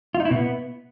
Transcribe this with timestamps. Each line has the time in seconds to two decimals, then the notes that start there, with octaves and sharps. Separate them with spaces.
0.15 F4
0.20 D#4
0.25 E4
0.31 B2
0.36 B3